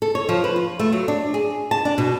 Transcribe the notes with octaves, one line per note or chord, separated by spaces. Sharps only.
A4
C#5
F3
B4
F4
A3
F#3
D4
G#4
A5
D4
B2